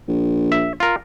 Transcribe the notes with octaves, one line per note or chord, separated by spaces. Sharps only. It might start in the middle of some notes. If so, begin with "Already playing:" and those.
A#1
E5
F4 A#4